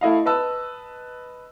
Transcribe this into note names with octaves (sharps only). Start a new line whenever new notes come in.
A3 E4 D#5 F5
B4 D#5 A5 E6